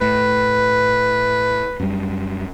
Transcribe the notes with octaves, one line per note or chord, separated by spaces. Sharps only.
A2 B4
F#2 G3